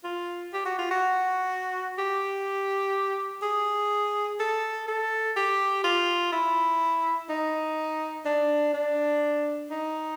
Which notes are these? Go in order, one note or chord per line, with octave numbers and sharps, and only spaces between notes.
F4
G4
F#4
F4
F#4
G4
G#4
A4
A4
G4
F4
E4
D#4
D4
D4
D#4